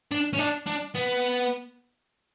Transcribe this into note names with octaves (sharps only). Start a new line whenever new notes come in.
D4
C#4
D4
D4
B3